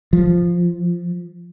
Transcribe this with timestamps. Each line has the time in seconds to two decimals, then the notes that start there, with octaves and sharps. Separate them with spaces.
0.13 F3